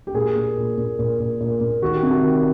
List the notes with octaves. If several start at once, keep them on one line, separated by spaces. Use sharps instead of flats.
G4
A#2 G#4
A#2
A#2
A#2
A#2
A#2
A#2
A#2
D#3 F#4
G4
C3
F#4
D#3